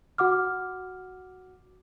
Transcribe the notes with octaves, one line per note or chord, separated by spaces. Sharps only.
F#4 F#5 D6 F6